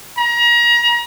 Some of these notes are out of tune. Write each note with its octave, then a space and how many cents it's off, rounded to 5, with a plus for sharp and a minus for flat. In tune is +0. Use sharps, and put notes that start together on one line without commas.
A#5 +30